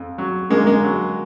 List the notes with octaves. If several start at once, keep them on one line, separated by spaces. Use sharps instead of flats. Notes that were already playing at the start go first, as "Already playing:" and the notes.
Already playing: F2
F#3
D3 G#3 A#3
G#3 A#3
F#3